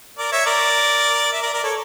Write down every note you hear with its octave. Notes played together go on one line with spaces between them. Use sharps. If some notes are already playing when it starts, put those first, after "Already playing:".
A#4 D5
C#5 E5
A#4 D5
E5
A#4 D5
A#4 D5
A4 C#5